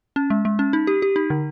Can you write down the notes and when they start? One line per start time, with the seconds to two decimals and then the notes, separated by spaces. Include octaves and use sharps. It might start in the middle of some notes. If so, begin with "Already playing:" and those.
0.16 C#4
0.30 G#3
0.45 G#3
0.59 C#4
0.73 D#4
0.87 G4
1.02 G4
1.16 D#4
1.30 D3